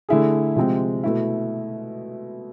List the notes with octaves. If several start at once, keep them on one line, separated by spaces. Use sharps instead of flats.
D3 A3 E4 G#4
C3 F3 G#3 C4
B2 A3 E4